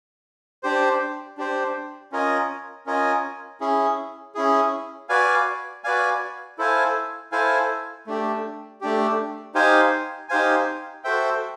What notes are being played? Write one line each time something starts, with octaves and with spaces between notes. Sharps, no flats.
D4 G4 C5
D4 G4 C5
C#4 F4 A#4 D#5 G#5
C#4 F4 A#4 D#5 G#5
C#4 E4 G#4
C#4 E4 G#4
F#4 B4 D5 F5 G#5
F#4 B4 D5 F5 G#5
E4 A4 C5 F5 G#5
E4 A4 C5 F5 G#5
A3 D4 G4
A3 D4 G4
D#4 G4 C5 F5 G#5
D#4 G4 C5 F5 G#5
F#4 A4 C5 E5 G5